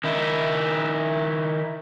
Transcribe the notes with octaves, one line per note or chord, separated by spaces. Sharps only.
D#3 D#4 E4